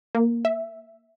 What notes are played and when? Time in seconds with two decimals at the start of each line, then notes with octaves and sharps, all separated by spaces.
0.15 A#3
0.45 E5